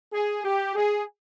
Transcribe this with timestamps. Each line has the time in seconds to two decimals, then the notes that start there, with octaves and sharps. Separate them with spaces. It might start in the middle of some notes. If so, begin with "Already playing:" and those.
0.13 G#4
0.44 G4
0.76 G#4